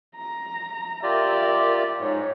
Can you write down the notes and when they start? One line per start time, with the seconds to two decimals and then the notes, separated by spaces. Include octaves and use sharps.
0.16 A#5
1.03 F4 G4 A#4 D5 E5
1.99 G#2 C#5